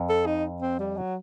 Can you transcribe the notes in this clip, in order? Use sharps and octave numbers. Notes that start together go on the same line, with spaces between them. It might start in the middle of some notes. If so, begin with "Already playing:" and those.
Already playing: F2
A4
D#4
C4
G3
F#3